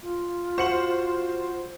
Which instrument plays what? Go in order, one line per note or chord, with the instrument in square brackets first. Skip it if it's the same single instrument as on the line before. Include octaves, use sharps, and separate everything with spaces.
[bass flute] F4
[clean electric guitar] F#4 [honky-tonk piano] C5 C#7 F#7